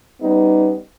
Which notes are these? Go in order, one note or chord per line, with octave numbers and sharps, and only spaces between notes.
G3 B3 C#4 D#4